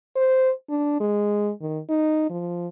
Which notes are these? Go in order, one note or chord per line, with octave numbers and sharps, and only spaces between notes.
C5
D4
G#3
D#3
D#4
F3